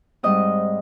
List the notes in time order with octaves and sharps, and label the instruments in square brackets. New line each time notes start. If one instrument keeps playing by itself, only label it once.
[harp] G#2 G3 C4 D#5 D#6